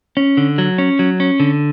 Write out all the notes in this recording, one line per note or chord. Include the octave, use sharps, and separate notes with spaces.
C#4
D3
F#3
C#4
F#3
C#4
D3